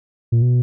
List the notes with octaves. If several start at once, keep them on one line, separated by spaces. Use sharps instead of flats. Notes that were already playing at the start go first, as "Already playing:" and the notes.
A#2
B2